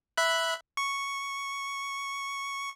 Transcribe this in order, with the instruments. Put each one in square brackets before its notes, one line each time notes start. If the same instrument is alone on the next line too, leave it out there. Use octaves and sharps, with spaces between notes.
[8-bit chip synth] E5 B5 F#6
C#6